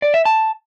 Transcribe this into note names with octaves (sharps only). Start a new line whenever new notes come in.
D5
E5
A5